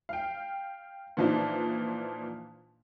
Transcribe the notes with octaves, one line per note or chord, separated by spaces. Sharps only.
F5 G5
A#2 E3 F3 D4 D#4 F4